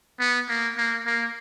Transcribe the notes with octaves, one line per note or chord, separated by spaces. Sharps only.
B3
A#3
A#3
A#3